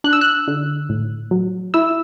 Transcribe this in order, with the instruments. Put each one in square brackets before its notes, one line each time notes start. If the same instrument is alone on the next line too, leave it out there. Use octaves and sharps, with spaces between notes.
[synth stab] D4 F#6
E6
F#6
D3
A2
F#3
E4 E6